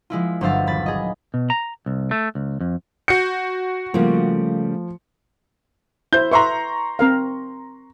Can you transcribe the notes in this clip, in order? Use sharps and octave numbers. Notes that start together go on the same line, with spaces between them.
F3 G#3 E4 F4
G1 F#3 C5 E5 F5 A6
D#1 B5 A6
G#4 D#5
B2
A#5
C2
A3
C#2
F2
F#4 G6 C#7
C#3 F3 G3 A3 A#3
E4 C5 G6
B4 E5 A#5 C6 C#6
C4 A#4 F5